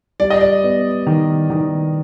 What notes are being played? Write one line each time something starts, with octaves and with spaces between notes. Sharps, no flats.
G3 D5
D#5
D5
B3
D#3
D#3